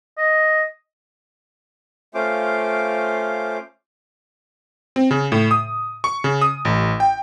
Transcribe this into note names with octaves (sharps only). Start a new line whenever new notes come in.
D#5
A3 C#4 F4 C5 F5 D6
C4
C#3
A2
D#6
C#6
C#3
D#6
A1
G5